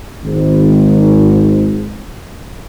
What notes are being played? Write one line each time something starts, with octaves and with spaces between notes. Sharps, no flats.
G#1 G#2